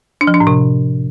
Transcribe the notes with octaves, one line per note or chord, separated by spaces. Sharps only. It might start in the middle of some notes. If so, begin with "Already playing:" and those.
D4
F3
D4
A2
C3